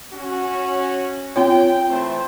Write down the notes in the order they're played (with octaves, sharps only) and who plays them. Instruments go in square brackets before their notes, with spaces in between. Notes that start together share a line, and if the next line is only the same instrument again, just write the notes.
[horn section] C#4 F#4
[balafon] C4 F4 C#5 [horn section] G5
[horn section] E3 A3 C5